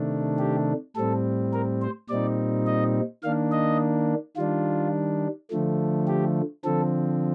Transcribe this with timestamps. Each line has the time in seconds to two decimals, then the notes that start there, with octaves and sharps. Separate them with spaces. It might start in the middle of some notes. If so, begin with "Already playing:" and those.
Already playing: C3 D#3 A3 D4
0.39 G4
0.96 A2 G3 C4 A4
1.53 A#4
1.82 C5
2.09 A#2 G3 C4 D#4 D5
2.67 D#5
3.23 D#3 A#3 D4 F5
3.52 D#5
4.37 D#3 G3 D4 F4
5.51 D3 F3 A3
6.08 G4
6.64 D3 F3 C4 A4